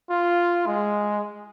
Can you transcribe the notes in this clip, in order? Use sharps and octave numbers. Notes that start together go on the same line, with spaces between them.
F4
G#3